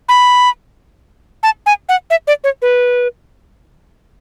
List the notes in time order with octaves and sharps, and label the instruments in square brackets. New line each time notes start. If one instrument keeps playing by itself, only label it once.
[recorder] B5
A5
G#5
F#5
E5
D5
C#5
B4